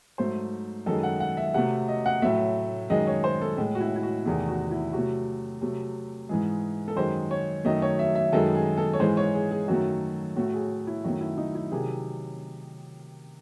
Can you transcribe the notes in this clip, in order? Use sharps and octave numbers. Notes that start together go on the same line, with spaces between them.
G#2 F#3 A3 C5
F#2 D#3 G#3 A4
F#5
F#5
E5
C3 F#3 A3 F#5
D#5
F#5
A2 F#3 A3 E5
F#2 D#3 G#3 D#5
C#5
C5
A4
A2 G#3
F#4
E4
E4
F#4
E2 C3 D#3 A3 G#4
F#4
E4
C3 F#3 A3 F#4
C3 F#3 A3
G#2 E3 G#3 G#4
A4
F#2 D#3 G#3 C5
C#5
F#2 D#3 F#3 A3 D#5
C#5
E5
E5
F#2 D#3 G#3 A4
G#4
A4
C#5
G#2 E3 G#3 C5
C#5
G#4
G#4
F#2 D#3 F#3 A3 F#4
A2 F#3 A3 F#4
G#4
E4
F#2 D#3 F#3 A3 F#4
E4
D#4
E4
C3 D#3 F#3 G#4